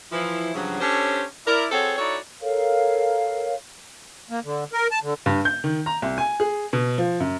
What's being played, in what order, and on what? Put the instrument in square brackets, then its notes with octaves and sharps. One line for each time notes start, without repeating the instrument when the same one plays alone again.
[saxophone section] E3 F3 E4
G2 C#3 F3 F#3
C#4 D4 G4 A4 C5 C#5
E4 A#4 D5
C4 F#4 G#4 A4 C5 C#5
D#4 E4 F#4 A4 C#5 D5
[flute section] A4 A#4 C#5 F5
[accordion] A#3
D3
A#4
A5
D3
[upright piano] G2
G6
D#3
A#5
C2
G#5
G#4
B2
F3
F#2